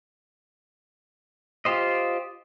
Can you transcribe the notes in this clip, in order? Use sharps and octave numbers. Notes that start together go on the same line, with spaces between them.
F4 G4 C5 D#5